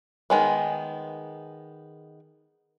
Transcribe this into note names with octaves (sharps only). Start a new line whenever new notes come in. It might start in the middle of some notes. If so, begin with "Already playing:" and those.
D#3 G#3 B3